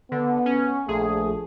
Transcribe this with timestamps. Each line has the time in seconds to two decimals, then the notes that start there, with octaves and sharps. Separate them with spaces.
0.12 D3 B3
0.46 C#4
0.88 A#1 A3 G#4